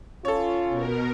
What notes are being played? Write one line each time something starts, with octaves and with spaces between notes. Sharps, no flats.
C#4 F4 A4 C#5
B2 A#4